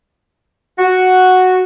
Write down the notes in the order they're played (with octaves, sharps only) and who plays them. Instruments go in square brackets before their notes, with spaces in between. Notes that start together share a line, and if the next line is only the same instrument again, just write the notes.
[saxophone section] F#4